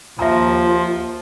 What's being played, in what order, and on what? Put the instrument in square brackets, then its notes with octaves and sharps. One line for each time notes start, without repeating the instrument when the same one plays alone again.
[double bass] D#2 [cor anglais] F3 [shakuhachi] F4 [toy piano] E5 A#5